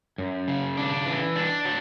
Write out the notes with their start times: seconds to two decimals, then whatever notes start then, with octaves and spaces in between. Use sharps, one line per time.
0.18 F#2
0.48 C#3
0.77 D4
1.06 E3
1.36 D4
1.65 F#3